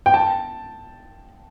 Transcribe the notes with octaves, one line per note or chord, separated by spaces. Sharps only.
G5
A5